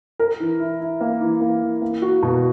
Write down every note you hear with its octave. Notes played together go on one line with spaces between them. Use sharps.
A#4
E3
E4
E4
A#3
E3
A#3
E3
A#3
F#4
B2